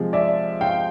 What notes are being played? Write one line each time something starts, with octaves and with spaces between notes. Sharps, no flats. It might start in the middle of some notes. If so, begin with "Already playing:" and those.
Already playing: C3 F3 G#3
D5 E5
F5 G5